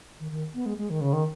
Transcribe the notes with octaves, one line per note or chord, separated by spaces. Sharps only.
D#3
D#3
B3
G#3
G#3
D#3
C#3
D#3